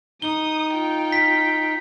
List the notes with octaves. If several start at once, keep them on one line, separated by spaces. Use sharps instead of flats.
D#4 D#6 G7
F4 G5
B6